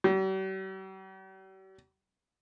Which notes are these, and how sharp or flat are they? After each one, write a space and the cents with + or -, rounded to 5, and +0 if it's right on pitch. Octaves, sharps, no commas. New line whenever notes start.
G3 -45